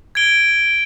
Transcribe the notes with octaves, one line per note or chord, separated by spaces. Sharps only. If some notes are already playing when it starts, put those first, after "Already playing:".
G#6 D7 G7